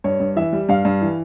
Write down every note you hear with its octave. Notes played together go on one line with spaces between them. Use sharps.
G2 C#5
G2
E3 E5
G3
G2 F5
G2
E3